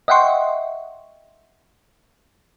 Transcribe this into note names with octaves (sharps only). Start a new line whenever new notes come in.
D#5 E5 F#5 G5 C6 C#6